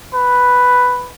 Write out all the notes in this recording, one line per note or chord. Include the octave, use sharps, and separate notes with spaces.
B4